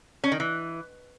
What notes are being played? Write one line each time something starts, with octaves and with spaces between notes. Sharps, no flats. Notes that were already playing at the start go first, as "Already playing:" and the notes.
C#4
D#3
E3